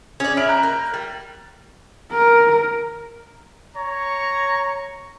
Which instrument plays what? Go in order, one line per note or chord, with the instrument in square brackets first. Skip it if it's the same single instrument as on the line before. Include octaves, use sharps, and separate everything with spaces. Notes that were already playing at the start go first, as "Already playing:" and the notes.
[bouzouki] C#4 D5 [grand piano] G#4
[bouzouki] E4 [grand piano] F6 B6 D7
[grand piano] A#5 F#6 G6
[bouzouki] A#3
G3
[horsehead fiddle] A#4
[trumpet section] C#5 A#5 C#6